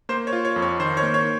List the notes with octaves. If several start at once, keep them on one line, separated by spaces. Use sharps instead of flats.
A#3 C5
C#5
F4
C#5
F2
C#5
D#3 C5
C#5
A#3
C#5